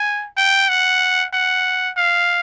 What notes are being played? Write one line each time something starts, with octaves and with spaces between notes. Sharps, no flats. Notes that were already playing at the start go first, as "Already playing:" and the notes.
Already playing: G#5
G5
F#5
F#5
F5